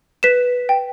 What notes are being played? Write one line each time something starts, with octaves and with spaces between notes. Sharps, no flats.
B4 B6 E7
G5